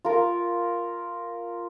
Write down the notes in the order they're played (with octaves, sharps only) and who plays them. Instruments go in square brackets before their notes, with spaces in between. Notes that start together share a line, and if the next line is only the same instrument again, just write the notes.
[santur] F4 A#4